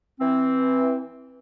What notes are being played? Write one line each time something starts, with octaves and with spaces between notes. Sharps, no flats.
E3 C4